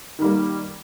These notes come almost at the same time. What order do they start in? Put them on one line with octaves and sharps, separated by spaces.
D#3 G3 A#3